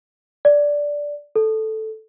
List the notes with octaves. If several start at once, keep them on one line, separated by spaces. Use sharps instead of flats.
D5
A4